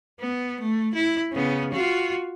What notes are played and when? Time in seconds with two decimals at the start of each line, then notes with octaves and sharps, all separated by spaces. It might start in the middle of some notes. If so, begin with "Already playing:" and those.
0.20 B3
0.60 A3
0.94 E4
1.32 C#3 B3
1.72 F4 F#4